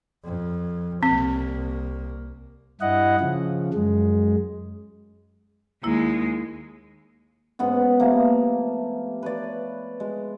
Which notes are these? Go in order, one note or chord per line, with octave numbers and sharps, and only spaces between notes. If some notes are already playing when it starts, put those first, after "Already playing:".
F2
C2 A#3 C4
G2 E4 D#5 F#5
C#3 F3
F#2 G#3
D#2 G#3 A#3 E4
G#2 B3 C#4 F#5
C3 F3 A3 A#3
B4 C#5 D5
G#3